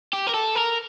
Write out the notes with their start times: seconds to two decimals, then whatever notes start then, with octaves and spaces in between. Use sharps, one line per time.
0.13 G4
0.27 A#4
0.34 A4
0.56 A#4